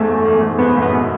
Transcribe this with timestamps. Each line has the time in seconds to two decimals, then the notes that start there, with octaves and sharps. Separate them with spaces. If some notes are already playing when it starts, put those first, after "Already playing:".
Already playing: E2 G#2 A3
0.08 F#2
0.25 E2
0.42 E2 G#2
0.58 E2 G#2 B3
0.75 F#2 A2
0.82 B3
0.93 B2